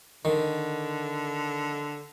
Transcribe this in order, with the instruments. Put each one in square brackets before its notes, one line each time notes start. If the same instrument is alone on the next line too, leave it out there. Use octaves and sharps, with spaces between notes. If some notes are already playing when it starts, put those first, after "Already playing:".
[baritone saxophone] D3 [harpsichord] D#3